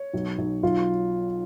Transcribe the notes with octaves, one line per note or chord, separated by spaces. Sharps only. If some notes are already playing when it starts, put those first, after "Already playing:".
Already playing: C#5
B1
B1
B1 F4